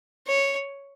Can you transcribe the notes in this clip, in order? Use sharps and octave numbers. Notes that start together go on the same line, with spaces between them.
C#5